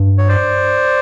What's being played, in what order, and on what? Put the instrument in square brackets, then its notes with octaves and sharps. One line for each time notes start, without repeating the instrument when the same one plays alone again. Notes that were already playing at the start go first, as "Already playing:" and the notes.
Already playing: [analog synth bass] G2
[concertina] C#5
C5 D5